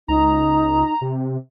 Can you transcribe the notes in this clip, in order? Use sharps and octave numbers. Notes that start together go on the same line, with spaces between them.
C#2 D#4 A#5
C3